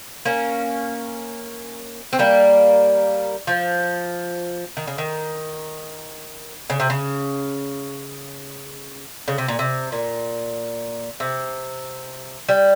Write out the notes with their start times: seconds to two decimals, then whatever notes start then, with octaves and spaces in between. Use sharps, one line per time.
0.25 A#3 C#4
2.13 C4
2.19 G3 A#3
3.47 F3
4.77 D#3
4.87 C#3
4.98 D#3
6.70 C#3
6.80 C3
6.90 C#3
9.28 C#3
9.38 C3
9.48 A#2
9.59 C3
9.92 A#2
11.20 C3
12.49 G3